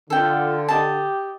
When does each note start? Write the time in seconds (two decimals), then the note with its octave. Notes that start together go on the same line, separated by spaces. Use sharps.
0.10 D3 F4 A4 G5
0.68 G4 D#5 A5